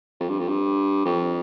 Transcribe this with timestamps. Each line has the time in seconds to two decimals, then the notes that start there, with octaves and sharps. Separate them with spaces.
0.20 F2
0.29 G2
0.39 F2
0.48 G2
1.05 F2